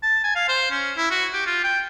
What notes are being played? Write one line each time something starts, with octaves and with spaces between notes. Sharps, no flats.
A5
G#5
F5
C5
C#4
E4
F#4
G4
F4
G5